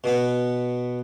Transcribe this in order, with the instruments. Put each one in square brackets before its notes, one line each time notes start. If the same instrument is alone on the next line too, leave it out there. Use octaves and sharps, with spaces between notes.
[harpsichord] B2 B3